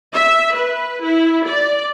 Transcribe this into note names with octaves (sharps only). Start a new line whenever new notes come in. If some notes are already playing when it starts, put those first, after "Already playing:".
E5
B4
E4
D5